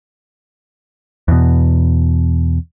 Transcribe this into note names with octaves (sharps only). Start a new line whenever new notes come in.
E2 B2